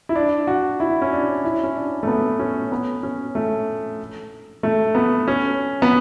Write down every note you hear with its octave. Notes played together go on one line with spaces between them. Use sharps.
E4
D4
F#4
E4
C#4
D4
E4
C#4
D4
A3
B3
C#4
B3
C#4
A3
A3
B3
C#4
B3